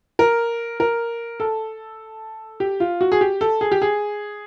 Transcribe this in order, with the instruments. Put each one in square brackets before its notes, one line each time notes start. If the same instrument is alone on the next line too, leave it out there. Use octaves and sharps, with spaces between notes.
[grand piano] A#4
A#4
A4
G4
F4
F#4
G#4
G4
A4
G#4
G4
G#4